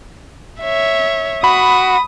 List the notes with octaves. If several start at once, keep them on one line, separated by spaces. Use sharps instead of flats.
C#5 E5
F#4 B5 D#6